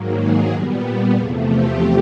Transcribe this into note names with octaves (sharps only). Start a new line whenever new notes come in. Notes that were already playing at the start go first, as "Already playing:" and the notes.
Already playing: G#2 D#3 F#3 A#3
G#4
A#2 G3 B3
E2 C3 F3 A3 G#4
G4